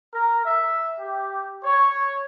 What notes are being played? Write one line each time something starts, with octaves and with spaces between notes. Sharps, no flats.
A#4
E5
G4
C#5